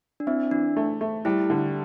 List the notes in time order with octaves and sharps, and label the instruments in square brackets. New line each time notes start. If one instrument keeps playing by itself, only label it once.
[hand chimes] D4
[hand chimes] C4 [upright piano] E4
[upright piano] E3 [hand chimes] D4
[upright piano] A3
A3
[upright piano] G3 [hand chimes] E4
[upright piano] D3